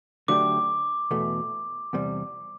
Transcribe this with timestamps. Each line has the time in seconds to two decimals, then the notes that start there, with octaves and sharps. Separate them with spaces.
0.28 D3 F#3 A3 D4 G4 D6
1.11 E2 B2 A3
1.93 E2 C3 G3